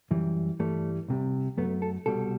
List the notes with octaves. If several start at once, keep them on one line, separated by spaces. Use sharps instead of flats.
F#2 E3 G3
G2 E3 G3 A3
C2 C3 G3
F#2 F#3 A3 B3
A4
C2 B2 G3 A4